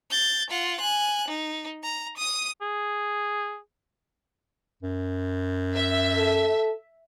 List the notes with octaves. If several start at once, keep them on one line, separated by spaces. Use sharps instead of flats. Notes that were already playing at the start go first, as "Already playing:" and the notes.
G6 A6
F4 F#5
G#5 F#6
D#4
A#5
D#6 D#7
G#4
F#2
E5
A4